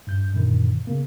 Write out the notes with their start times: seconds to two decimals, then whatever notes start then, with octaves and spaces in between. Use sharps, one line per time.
0.07 G2 G6
0.34 F#2 A#2 D3 D#3
0.87 C#3 A#3